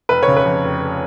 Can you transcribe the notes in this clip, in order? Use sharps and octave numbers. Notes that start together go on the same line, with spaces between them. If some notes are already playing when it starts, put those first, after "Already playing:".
F1 B4
C#5
C#3
B4
F2
F1